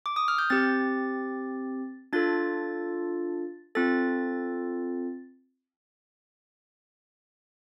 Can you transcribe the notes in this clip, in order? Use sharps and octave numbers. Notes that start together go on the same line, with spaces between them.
D6
D#6
F6
G6
C4 G4 A6
D4 F4 A4 A6
C4 F4 A4 A6